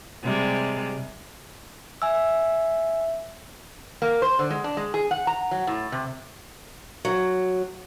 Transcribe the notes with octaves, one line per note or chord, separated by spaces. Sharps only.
C3 G3 G#3
E5 G#5 E6
A#3
C5
D3
G#3
D4
G#3
G#4
F#5
A#5
F#3
A2
C3
F#3